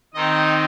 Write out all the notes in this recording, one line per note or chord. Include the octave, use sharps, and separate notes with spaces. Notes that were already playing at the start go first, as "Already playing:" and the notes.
D#3 C4 D#4 D#5